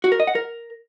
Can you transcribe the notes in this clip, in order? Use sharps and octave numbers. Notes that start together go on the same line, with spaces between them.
F#4
A#4
D#5
F#5
A#4